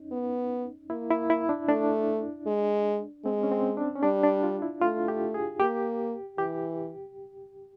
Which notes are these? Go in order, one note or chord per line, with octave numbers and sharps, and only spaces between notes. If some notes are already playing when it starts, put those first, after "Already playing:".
Already playing: C#4 D#4
B3
A#3 E4
E4
E4
D4
A3 D4
G#3
G#3 C4
C#4
C4
D4
C#4
G3 D4
D4
F4
E4
A3 F4
G4
G#4
A#3 G4
E3 G4